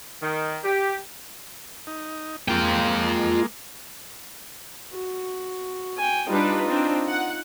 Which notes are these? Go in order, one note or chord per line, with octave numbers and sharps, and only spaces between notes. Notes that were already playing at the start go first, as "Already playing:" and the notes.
D#3
G4
D#4
G#3 A#3 F4 G5
F#4
G5 G#5
G3 D4 D#4 F4 B4
C4 D4
F#5